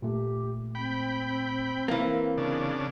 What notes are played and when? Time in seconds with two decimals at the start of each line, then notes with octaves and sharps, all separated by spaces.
0.02 A#2 A3 G4
0.75 C4 G5 B5
1.88 E3 A#3 A#4 F5
2.38 C#3 D4